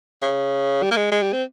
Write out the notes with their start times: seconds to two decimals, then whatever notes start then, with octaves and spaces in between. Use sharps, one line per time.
0.22 C#3
0.83 G3
0.91 A#3
0.96 G#3
1.12 G#3
1.23 G3
1.33 C4